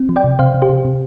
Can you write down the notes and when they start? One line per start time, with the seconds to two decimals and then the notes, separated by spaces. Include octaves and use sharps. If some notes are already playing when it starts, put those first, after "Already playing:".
Already playing: C4
0.09 F3
0.16 D5 G5
0.24 C3
0.39 C3 C5 F5
0.54 C3
0.62 G4 C5
0.70 C3
0.85 C3